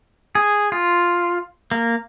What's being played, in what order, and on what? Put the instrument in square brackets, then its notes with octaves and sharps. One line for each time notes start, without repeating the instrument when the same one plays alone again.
[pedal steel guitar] G#4
F4
A#3